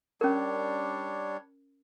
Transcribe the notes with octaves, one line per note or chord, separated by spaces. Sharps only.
G3 C#4 D4 A#4 C#5